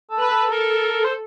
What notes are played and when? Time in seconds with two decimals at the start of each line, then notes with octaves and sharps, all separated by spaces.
0.11 A4
0.20 B4
0.31 A4
0.51 A4 A#4
1.04 C5